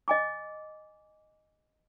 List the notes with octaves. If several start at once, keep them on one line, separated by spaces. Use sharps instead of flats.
D#5 G#5 D6